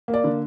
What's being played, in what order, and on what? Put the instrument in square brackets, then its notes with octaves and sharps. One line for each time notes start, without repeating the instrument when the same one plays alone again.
[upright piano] A#3
D5
D3